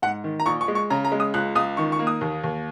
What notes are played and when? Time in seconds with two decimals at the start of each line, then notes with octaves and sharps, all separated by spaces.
0.02 G#2 F#5
0.24 D#3
0.40 A#5
0.46 A#1 C#6
0.61 C#6
0.68 G#3
0.75 C#6
0.90 C#3 A#5
1.05 A#5
1.12 G#3
1.20 D#6
1.34 C#2 F#6
1.56 C#2 D#6
1.77 D#3 C#6
1.92 C#6
1.99 A#3
2.07 D#6
2.21 D#2
2.44 D#2